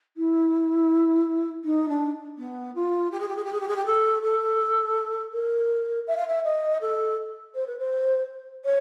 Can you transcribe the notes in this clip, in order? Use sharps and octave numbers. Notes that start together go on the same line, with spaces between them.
E4
D#4
D4
B3
F4
G4
G#4
G4
G#4
G4
G#4
G4
G#4
G4
A4
A4
A#4
E5
F5
E5
D#5
A4
C5
B4
C5
C#5